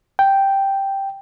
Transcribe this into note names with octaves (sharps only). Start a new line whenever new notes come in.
G5